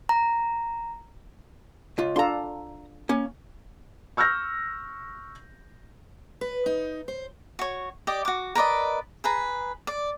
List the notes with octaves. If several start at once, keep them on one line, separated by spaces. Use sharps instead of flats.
A#5
C#2 F4
D4 F4 A4 A#5 C6
A#3 C#4
C#6 E6 F6 G6 A#6
B4
D#4
C5
F#4 C#5
G4 D5 D#5
F#4 D6
A#4 B4 D5 D#5
G#4 B4 A#5
D5